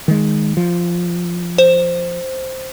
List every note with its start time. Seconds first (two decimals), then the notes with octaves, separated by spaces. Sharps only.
0.08 D#3 G#3
0.57 F3
1.58 C5